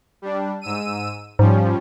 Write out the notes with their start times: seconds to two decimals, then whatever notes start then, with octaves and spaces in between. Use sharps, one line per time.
0.22 G3 D4
0.61 G#2 E6 D#7
1.39 G#2 F3 G3 C#4